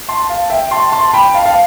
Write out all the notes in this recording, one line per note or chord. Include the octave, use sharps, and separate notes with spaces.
A5 C6
F5 A5
E5 G5
A5 C6
A5 C6
G5 B5
F5 A5
F5